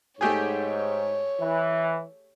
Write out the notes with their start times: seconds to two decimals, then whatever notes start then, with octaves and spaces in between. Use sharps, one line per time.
0.21 G#2 A3 G4 G#4 C#5
1.40 E3